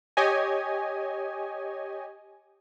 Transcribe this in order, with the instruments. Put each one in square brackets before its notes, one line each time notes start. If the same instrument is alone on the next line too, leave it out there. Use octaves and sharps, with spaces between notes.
[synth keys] G4 C#5 D#5 G#5